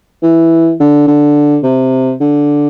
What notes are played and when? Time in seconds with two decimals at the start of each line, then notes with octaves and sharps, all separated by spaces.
0.23 E3
0.80 D3
1.07 D3
1.63 C3
2.21 D3